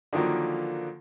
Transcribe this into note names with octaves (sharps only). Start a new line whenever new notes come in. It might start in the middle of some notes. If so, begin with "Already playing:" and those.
D3 D#3 F3 F#3 A#3